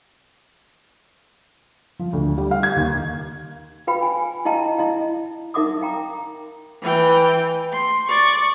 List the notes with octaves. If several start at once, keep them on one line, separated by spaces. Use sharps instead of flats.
F3
D2
G3
F5
G#6
D#2
F4 B4 F5 G5 B5
G#5
E4 D#5 F5 G5 A5 A#5
E4 D#5 F5
D#4 A#4 E5 F#5 D6 D#6
F5 G5 A#5
E3 G5
C6
D5 C#6